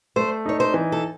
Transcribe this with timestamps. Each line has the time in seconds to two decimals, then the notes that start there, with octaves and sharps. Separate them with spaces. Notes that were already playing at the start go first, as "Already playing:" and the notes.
0.16 A3 C5
0.46 D#4 C#5
0.60 C5
0.74 E3
0.92 A4